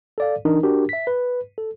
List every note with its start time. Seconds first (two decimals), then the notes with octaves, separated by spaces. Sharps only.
0.18 A4 D5 F5
0.45 E3 D4 D#4 A#4
0.63 D4 F#4 G4 A#4
0.89 E5 B6
1.07 B4
1.58 A4